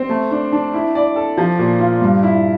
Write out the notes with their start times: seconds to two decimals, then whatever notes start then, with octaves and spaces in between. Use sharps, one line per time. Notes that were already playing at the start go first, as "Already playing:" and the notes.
Already playing: C4
0.09 A3
0.31 D4
0.52 D4
0.74 E4
0.95 D5
1.16 A4
1.38 F3
1.59 A#2
1.80 F4
2.01 G2
2.23 E4